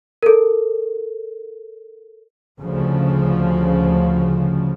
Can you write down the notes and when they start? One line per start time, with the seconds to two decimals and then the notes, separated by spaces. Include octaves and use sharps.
0.23 A4 A#4
2.60 D2 C#3 F3